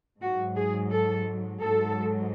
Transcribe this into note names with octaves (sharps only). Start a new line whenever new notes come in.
G#2 F#3 F#4
G#4
A4
G#2 F#3 A4